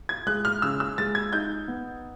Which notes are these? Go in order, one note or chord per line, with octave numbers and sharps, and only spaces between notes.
G#6
G#3 F#6
F6
C#3 E6
E6
G#3 A6
G#6
D#4 G6
B3